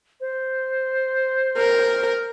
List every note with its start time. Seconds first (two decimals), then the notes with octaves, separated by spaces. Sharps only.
0.21 C5
1.57 A#4